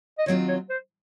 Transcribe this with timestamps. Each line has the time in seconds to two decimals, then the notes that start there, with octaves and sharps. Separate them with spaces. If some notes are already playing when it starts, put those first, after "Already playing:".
0.19 D#5
0.26 D#3 F#3 C4 F4 C#5
0.48 C#5
0.70 C5